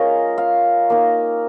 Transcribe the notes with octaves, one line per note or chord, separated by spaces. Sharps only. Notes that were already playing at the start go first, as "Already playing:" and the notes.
Already playing: G#3 C#4 F4 A#4 C#5 D#5 F5
F5
A#3 D#4